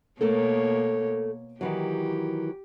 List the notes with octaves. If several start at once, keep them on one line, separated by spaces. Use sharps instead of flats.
B2 A3 A#3 A4 A#4 C#5
D#3 E3 F#3 G4